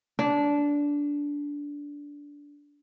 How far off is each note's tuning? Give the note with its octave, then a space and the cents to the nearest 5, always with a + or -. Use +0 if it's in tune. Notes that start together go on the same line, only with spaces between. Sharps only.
D4 -15